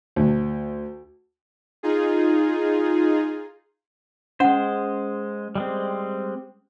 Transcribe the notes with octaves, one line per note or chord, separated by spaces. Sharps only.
D2
D#4 F4 G#4
G#3 C#4 C5 F#5
G3 G#3 C4